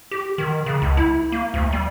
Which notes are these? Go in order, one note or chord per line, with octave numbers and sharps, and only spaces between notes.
G4
D#3
C#3
C#2
E4
A#3
D2
G3